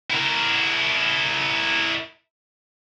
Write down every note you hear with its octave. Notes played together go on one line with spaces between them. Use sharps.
E4 A#4